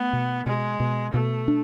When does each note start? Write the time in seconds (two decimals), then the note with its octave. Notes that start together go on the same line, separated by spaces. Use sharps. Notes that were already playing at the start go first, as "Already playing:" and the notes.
Already playing: A3 B3
0.13 B2
0.46 B2 G#3
0.80 B2
1.13 B2 A3
1.48 D4